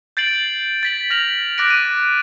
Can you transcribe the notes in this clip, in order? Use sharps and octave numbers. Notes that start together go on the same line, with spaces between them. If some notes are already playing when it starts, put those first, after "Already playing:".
G6 A6 C7 D7 F#7
A6 B6 F#7
F6 A#6 B6 F7 F#7
D6 F#6 A6 A#6 D7
D#7